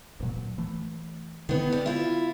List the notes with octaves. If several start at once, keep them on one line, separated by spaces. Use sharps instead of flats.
D1 A#2 F#3
E3 A3
D3 D#3 B3 C4
G3
E4 F4